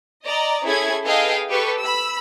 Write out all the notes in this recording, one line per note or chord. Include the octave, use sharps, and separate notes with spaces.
D5 D#5 A#5
C#4 E4 G#4 A4 G#6
G#4 A4 B4 D#5 F5 G5
G4 A4 B4 C#6
B5 E6